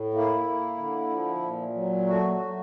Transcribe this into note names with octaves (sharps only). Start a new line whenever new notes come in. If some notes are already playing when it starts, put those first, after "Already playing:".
Already playing: A2
A#3 E4
A#3
D3
F3
A#2
F#3
A3 F#4
F#3